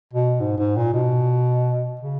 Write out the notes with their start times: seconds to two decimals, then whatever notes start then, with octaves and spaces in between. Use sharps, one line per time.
0.13 B2
0.40 G#2
0.58 G#2
0.76 A#2
0.94 B2
2.01 C#3